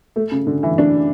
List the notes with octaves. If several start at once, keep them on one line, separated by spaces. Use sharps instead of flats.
A3
C#3
D3
E3
D4